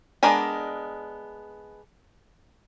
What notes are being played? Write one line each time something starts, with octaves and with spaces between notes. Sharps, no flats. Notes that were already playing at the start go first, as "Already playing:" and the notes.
G#3 B3 D4 A#4 G#5